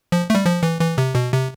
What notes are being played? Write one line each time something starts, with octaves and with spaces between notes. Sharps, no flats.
F3
A3
G3
F3
E3
E3
C3
B2
C3